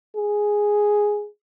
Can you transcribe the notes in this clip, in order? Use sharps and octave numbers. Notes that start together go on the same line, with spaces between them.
G#4